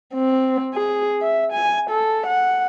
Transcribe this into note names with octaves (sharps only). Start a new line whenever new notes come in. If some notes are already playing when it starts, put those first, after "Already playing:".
C4
G#4
E5
G#5
A4
F#5